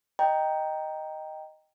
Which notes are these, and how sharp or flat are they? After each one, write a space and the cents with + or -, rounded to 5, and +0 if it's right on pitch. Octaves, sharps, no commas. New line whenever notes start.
D#5 +0 G5 +0 A#5 +0